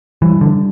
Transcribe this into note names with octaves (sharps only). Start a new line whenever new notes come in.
E3 G3
D3